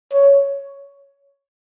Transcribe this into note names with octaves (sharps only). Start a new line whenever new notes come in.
C#5